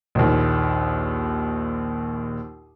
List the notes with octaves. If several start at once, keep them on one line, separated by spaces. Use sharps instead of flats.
A#1 D#2